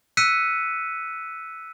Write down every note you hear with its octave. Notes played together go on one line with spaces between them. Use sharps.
E6 F#6 B6 C#7 D#7